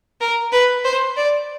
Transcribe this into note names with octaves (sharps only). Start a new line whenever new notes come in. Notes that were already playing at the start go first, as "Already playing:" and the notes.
A#4
B4
C5
D5